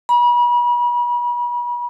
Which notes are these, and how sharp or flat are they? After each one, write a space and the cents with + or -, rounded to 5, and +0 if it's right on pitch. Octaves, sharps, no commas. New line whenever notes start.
B5 -40